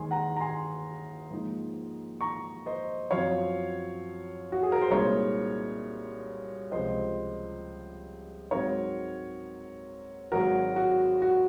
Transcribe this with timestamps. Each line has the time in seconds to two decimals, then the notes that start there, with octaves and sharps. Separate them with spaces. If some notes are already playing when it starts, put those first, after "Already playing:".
Already playing: D#2 D#3 G#3 G#5 C6
0.11 F#5 A#5
0.36 A#5
0.40 G#5 C6
1.31 G#2 F3 A#3 D#4
2.21 A#5 C#6
2.66 C5 D#5
3.11 F#2 F3 C4 C#5 F5
4.52 F#4
4.63 G#4
4.72 A#4
4.81 C5
4.91 C2 A#2 G#3 C4 D#4 A#4 C#5
6.71 C#2 C3 F3 C5 D#5
8.51 G#2 F#3 C4 D#4 A#4 C#5
10.32 G#1 G#2 F#3 F#4 A#4
10.76 F#4
11.22 F#4